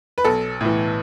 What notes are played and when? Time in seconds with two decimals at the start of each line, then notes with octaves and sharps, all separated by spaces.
0.18 B4
0.25 B1 A4
0.61 A2 E3